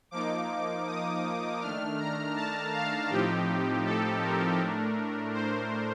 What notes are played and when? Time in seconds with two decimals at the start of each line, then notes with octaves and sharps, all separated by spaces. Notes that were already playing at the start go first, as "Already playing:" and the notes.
0.11 F3 A#3 D#4 D6
0.86 D#6
1.60 D#3 A3 D4 F6
1.98 A#5
2.36 A5
2.72 F5
3.10 A2 F3 C4 D#4 G4
3.85 A4
4.22 A#4
4.59 A2 A3 D4
5.33 C5